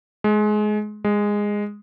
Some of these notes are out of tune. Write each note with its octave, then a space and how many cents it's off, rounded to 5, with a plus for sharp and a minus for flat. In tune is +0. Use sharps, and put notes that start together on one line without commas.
G#3 +25
G#3 -10